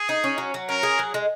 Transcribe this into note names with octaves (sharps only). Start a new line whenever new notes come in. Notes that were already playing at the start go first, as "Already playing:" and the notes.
Already playing: G#4
D#4
C#4
F#3
F#3
C#4 A#4
G#4
F#3
G#3